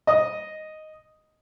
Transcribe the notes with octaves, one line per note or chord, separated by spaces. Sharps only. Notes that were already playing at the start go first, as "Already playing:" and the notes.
D#5 D#6